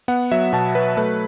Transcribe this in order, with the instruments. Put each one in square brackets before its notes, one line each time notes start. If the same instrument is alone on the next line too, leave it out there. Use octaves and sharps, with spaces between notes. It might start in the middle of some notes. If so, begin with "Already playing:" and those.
[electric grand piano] B3 F#5
F#3 E5
B2 A5
F#3 B4
A3 B4